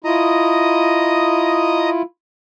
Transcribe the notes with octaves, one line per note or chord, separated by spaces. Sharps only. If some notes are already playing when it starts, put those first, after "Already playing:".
E4 F4 D#5 A#5 D#6